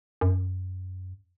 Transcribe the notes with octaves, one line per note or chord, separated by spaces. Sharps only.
F#2